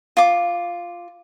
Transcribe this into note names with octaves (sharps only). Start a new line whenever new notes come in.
F4 D6